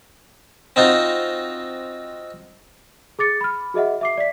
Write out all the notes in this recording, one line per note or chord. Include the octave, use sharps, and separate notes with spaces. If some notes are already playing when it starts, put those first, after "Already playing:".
C4 D#4 F4 F#4
G#4 D6 A6 C#7
B5 F6
F#4 G#4 D#5 E5 F#5
E5 D6 C7
D5 E5 B6